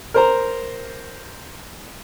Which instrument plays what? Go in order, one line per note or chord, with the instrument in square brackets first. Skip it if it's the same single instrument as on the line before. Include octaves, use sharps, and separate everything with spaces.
[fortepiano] A#4 C5 A#5